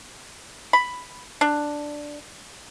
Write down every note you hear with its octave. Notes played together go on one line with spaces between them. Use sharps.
B5
D4